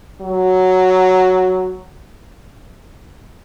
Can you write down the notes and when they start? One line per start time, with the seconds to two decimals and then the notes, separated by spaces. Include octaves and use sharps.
0.21 F#3